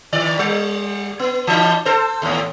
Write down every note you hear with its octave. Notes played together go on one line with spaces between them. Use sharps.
D#3 D5
G3
B3
E3 D#4
A4 C5
D#2 A2